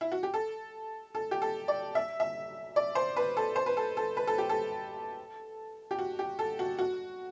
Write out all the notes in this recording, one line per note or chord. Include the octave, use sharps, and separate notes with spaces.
E4
F#4
G4
A4
A4
G4
A4
D5
E5
E5
D5
C5
B4
A4
C5
B4
A4
A4
B4
A4
G4
A4
G4
F#4
G4
A4
F#4
F#4